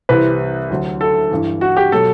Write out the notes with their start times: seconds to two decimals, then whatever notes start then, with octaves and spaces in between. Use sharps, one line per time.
0.09 C2 C3 E3 B4
0.70 D2 D3 F#3
1.01 A4
1.31 G2 E3
1.61 F#4
1.77 G4
1.92 B2 F#3 A4